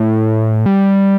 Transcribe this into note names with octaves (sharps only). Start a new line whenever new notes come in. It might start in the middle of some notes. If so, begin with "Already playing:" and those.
Already playing: A2
G3